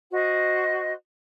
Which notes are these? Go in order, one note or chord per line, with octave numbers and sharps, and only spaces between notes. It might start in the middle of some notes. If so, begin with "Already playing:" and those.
F#4 C5 D#5